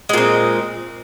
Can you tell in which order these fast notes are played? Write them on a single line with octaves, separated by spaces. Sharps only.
G#3 A#2 C4